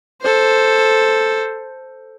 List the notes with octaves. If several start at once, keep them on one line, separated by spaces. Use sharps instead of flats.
A4 C5